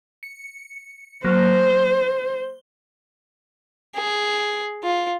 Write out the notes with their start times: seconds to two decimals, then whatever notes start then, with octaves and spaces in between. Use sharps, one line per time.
0.23 C#7
1.24 F#3 A#3 C5
1.69 G7
3.95 G#4
4.84 F4